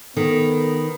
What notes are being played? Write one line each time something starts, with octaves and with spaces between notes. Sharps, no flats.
D#3 B3 A4